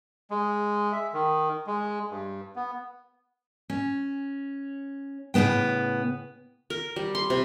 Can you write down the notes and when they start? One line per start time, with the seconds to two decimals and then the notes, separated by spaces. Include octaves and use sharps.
0.31 G#3
0.93 E5
1.14 D#3
1.67 G#3
2.10 G2
2.56 B3
3.70 C#4
5.34 A2 C#3 F#3 B3 G5
6.70 A#4
6.96 G3
7.15 C6
7.30 C3